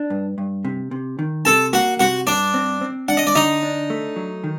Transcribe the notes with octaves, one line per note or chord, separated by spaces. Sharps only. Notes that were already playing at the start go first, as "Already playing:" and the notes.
Already playing: D4
G2
G2
C3
C3
D#3
C3 A4 A5
A#3 F#4 F#5
C3 F#4 F#5
G2 D4 D5
C4
C4
D4 F#5
D#5
D5
D3 D#4 D#5
D4
A3
F#3
D#3